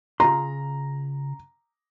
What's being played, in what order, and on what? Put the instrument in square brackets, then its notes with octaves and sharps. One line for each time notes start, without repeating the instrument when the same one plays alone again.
[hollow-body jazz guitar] C#3 F4 C6 [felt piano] A#5